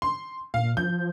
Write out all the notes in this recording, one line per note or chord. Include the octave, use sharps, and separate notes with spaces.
C6
A#2 F5
F3 G6